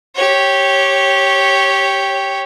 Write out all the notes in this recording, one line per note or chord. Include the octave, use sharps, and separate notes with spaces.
G4 C#5